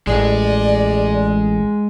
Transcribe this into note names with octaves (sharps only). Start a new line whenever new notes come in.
A1 G#3 G#4 D5